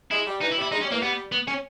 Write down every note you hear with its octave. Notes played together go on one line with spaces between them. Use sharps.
G#3 E4
G3
E3 D#4
E4
G3
E4
G#3 D#4
G3 C#4
E3 A#3
G3 B3
B3
C#4